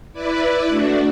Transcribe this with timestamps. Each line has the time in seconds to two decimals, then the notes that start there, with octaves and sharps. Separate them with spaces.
0.13 E4 B4 D5
0.69 A3 D4 F#4